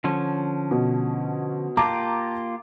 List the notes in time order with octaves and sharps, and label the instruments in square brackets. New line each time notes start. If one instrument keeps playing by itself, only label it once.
[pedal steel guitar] D3 F3 C#4
[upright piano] B2
[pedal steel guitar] A#3 F4 G4 [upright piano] A5 A#5 D6